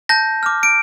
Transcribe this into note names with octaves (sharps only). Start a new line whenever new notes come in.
A5 G6 A#6
D6 F6
D7